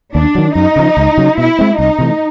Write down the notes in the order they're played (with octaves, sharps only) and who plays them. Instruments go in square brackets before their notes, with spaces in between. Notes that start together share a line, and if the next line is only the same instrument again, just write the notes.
[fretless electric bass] D#2 [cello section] D4
[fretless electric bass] D#3 F#3
[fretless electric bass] F#2 [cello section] D#4
[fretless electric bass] C#3 F3
C#2
C#3 F#3
[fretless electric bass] B2 [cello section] E4
[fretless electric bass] G#3 C4
[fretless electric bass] C2 [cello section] D#4
[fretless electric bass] C3 E3 A3